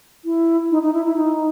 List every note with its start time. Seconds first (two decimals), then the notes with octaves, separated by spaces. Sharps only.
0.25 E4
0.71 D#4
0.82 D#4
0.94 E4
1.05 E4
1.16 D#4